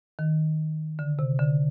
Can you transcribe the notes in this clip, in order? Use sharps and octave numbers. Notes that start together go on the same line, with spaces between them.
D#3
D3
C3
D3